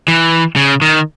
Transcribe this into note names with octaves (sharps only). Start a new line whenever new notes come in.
E3
C#3
D#3